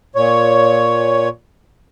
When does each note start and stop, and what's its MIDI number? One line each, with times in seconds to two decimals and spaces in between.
0.16 1.29 46
0.16 1.29 73